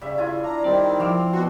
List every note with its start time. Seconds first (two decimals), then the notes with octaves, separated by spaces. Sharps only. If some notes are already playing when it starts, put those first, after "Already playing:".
0.01 C#3 G3 E5
0.18 E4 F4 G#5
0.44 D4 A#5
0.64 D#3 G3 C4 D5
1.00 F3 E4 F5 D6 E6
1.33 B2 F#4 C6